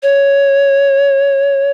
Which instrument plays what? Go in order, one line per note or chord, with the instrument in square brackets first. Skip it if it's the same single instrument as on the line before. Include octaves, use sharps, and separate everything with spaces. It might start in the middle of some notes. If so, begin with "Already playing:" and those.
[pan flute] C#5